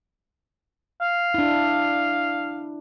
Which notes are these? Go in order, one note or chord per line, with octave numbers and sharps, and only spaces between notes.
F5
D4 E4